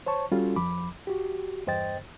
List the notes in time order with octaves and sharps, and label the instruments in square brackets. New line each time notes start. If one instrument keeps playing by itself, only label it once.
[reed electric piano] C5 C#5 A5 C#6
G3 C#4 F4 F#4 A4
F2 F3 B5 D6
F#4 G4
E2 G2 C5 D#5 G5 A6